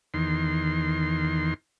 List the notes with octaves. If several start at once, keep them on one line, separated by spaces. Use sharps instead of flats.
E2 D#3 C6